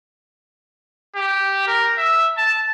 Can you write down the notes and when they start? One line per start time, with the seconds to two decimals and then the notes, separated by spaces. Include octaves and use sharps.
1.16 G4
1.67 A#4
1.98 E5
2.37 A5